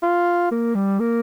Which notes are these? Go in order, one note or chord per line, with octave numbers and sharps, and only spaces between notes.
F4
A#3
G3
A#3